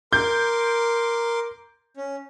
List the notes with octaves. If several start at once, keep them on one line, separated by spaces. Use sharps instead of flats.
A#4 C6 D6 G6
C#4